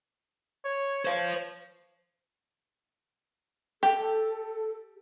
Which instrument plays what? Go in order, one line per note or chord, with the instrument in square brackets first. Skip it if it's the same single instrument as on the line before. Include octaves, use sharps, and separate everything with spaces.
[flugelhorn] C#5
[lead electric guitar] C5 F5 [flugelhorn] C#5
[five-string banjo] G4 [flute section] A4